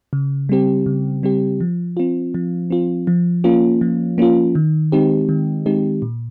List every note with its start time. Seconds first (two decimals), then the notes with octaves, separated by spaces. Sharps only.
0.13 C#3
0.49 G3 C4 G4
0.86 C#3
1.23 G3 C4 G4
1.61 F3
1.97 C4 F4
2.34 F3
2.70 C4 F4
3.07 F3
3.44 A#3 C#4 F4
3.81 F3
4.18 A#3 C#4 F4
4.55 D#3
4.92 G#3 C4 D#4 G4
5.29 D#3
5.66 G#3 C4 D#4 G4
6.02 A#2